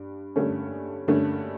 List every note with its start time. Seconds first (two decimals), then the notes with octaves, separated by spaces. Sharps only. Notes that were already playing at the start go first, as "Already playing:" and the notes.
Already playing: G2
0.36 G2 D3 A3 C#4
1.08 G2 D3 A3 C#4